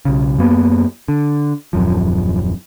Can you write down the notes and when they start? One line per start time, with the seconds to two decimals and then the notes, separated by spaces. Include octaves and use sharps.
0.05 B1 C#3
0.38 F#2 A#3 B3
1.08 D3
1.73 D#1 F#2 F3